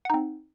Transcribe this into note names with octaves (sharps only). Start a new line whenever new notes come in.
C4 D#4 F#5